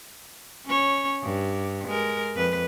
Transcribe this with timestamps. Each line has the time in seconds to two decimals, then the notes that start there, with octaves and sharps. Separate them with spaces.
0.66 C#4 C#5
1.23 G2
1.88 G#3 A#4
2.35 F2 B4